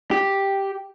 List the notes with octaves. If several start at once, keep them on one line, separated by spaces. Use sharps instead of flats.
G4